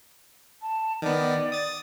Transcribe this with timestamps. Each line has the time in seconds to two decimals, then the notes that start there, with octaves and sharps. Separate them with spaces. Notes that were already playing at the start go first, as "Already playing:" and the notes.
0.62 A5
1.02 D#3 B3 D5
1.52 D#6 A6